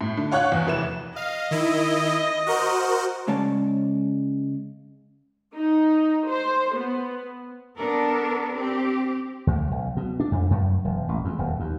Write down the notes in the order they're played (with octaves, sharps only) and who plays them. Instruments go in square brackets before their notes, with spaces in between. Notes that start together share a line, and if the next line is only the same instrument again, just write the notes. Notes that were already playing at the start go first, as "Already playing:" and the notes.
[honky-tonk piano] A2
D3
F4 C#5 F#5 C#6 F#6
E2
F1 E3 E7
[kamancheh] D#5 [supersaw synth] F5
[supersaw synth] D#3 E4
F#4 A#4 C5
[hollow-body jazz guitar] C#3 G#3 C#5 D5 A5
[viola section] D#4
C5
B3
[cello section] B3 D4 A4 A#4
C4 G4
[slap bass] D2
B1
B2
D4
F2
F#2
E1
A1
E2
D#1
D#2